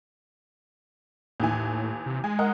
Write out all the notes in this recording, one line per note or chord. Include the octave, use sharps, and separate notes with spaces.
D#2 A2 E3 G#5
C3
G#3 G#5
A#4 D#5 F#5